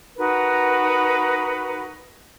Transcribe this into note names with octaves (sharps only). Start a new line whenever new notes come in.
D#4 F#4 A#4 B4